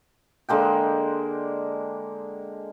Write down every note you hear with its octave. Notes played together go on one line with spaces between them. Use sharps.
D3 G#3 A#3 G5